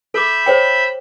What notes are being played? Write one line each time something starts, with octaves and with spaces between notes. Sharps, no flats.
A4 E5 B5 D6 G6
C5 C#5 G5